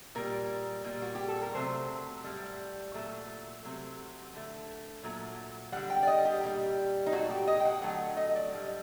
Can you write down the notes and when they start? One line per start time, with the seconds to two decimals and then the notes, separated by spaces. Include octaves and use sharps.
0.15 A#2 G3 A#4
0.84 A#2 G3
1.02 F#4
1.15 G4
1.28 A4
1.42 A#4
1.55 C3 F#3 A3 C5
2.24 A2 G3
2.94 A#2 F#3 A3
3.64 C3 F#3 A3
4.33 D3 A3
5.04 A#2 F#3 A3
5.72 D3 G3 F#5
5.90 G5
6.03 D5
6.07 D#5
6.25 G4
6.43 A#2 G3
7.06 D#4
7.12 A#2 F#3 A3 F#4
7.30 G4
7.47 D#5
7.60 G5
7.65 F#5
7.82 D3 F#3 A3 F#5
7.99 F#5
8.17 D#5
8.29 D#5
8.35 D5
8.52 A2 G3